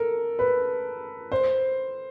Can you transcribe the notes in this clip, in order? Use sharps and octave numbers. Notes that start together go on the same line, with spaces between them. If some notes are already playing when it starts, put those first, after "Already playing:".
Already playing: A4 A#4
B4
C5